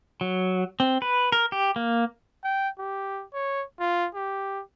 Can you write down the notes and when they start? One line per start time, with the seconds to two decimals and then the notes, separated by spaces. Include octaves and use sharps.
0.21 F#3
0.80 C4
1.02 B4
1.32 A#4
1.52 G4
1.76 A#3
2.44 G5
2.79 G4
3.34 C#5
3.80 F4
4.15 G4